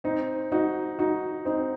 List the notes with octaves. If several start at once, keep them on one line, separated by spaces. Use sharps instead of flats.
C4 D#4
D#4 F#4
D#4 F#4
C4 D#4